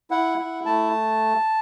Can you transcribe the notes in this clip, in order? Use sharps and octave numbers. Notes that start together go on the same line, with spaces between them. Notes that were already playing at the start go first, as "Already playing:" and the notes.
E4 F#5
E4
A3 A5